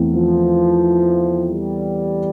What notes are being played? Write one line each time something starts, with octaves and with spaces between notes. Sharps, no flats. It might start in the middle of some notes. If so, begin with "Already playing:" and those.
Already playing: E2 E3 A3 C4
F3
G3